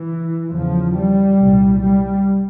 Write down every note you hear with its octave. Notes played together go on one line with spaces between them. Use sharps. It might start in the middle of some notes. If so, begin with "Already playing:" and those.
Already playing: E3
E2 C#3 F3
G3
C2 A#2
G3